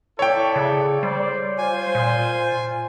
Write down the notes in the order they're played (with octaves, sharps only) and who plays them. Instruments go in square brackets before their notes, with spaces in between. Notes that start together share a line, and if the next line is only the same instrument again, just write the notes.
[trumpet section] E4 A4 D5 [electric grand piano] C#5 G5
[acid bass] C#3
[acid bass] G3 [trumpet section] C5 D5
[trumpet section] F4 C5 [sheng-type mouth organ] G#5
[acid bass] A#2